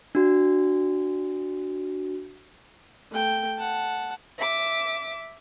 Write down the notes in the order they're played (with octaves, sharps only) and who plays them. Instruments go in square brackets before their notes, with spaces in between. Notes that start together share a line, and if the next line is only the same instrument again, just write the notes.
[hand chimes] D4 F#4
[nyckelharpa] A3 G5
F#5 A5
[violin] E5 D6